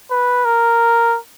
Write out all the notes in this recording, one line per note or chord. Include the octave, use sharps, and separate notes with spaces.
B4
A#4